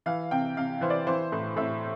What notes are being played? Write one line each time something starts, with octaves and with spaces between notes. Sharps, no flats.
E3 F5
C3 G5
C3 F5
E3 C5
D5
E3 C5
A2
A2 E5